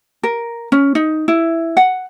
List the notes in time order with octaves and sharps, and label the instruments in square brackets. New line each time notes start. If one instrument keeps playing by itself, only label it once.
[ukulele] A#4
C#4
D#4
E4
F#5